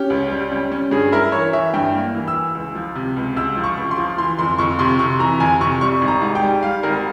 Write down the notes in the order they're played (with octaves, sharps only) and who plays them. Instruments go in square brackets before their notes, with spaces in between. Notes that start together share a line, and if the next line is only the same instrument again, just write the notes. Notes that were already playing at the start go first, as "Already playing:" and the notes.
Already playing: [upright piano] C#4 G4
C#2
G3
C#4
C#4
G2 G#4
E4 A#4
E3 C#5
E3 E5
G2 G5
A#3
E3
E6
E3
C#2
F3
C3
C#2
C#2 E6
F3
C#6
C#2
C6
F3
E3 C6
F2 C6
F2 C#6
C3 C6
C3 C#6
E3 A#5
F2 G#5
C3 C#6
G3 C#6
G#1
A#5
G#2
G5
G3
G3 F5
G#1 A#4